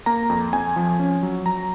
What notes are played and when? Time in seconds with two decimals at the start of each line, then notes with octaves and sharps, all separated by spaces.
0.06 A#3 A#5
0.30 F2
0.53 F2 G#5
0.76 F3
1.00 C#4
1.23 F#3
1.46 F#3 A#5